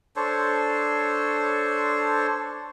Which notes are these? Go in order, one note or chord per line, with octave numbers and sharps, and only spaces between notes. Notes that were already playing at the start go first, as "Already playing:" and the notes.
D4 A4 C5 C#5